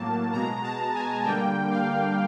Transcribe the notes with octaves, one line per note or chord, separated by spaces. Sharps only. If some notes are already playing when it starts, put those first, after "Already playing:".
Already playing: A2 F#3 A#3 A5
B2 G#3 A#5
A5
G#5
D3 G3 A#3 G5
F5